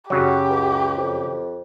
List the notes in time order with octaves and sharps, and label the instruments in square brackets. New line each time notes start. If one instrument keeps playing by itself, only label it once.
[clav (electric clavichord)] F#2 C#3 F#3 [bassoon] F#4 [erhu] G4
[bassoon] C#2
F2